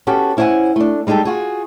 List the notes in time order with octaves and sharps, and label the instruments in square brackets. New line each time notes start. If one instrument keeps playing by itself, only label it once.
[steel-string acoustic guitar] B3 C#4 F#4 G4 A4
C#4 E4 C5 D5 F#5 G#5
A3 D4
G3 G#3 D#4 G4 A4
F4 F#4 G#4